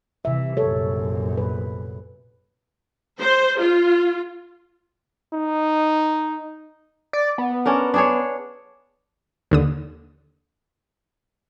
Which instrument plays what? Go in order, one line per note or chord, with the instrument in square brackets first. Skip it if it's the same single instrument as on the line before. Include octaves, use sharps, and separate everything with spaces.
[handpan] C3 E5 [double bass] E3
[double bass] A#1 F#2 [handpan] A4 C#5
[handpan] B4
[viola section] C5
F4
[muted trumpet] D#4
[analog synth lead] D5
B3
[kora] C#4 D4 A#4
D4 G#4 C#5
[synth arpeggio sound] D#2 D3 D#6